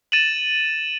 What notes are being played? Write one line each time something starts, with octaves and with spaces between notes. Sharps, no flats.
A6 D#7 E7 F#7